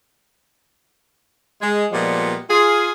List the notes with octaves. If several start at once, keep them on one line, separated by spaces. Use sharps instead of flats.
G#3
A#2 F3 G3 G#3 B3
F4 G#4